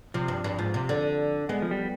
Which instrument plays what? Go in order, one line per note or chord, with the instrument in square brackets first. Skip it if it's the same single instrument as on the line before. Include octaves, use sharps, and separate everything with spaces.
[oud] C3 [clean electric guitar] F3
[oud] G2
G2
[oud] G#2 [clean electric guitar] F3
[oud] C3
D3
[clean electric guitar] G#3 [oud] B3
[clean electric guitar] F3
G3